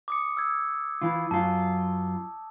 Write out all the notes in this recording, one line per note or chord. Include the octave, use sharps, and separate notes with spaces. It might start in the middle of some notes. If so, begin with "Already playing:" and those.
D6 D#6 C#7
E6 G#6
E3 F4
F#2 F#3 F4 A5